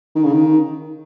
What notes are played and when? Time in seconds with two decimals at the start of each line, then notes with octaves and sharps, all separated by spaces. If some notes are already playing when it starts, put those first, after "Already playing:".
0.15 D#3
0.24 C#3
0.32 D#3